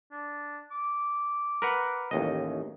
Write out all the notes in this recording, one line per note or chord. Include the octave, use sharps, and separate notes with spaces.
D4
D6
A#4 B4 F#5
A1 D#2 D#5